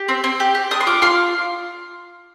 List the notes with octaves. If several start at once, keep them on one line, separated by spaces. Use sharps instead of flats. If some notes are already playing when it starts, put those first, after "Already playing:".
Already playing: G4
C4
C4
G4
G4
D4 D#6
C6
F4 D6
F4 C6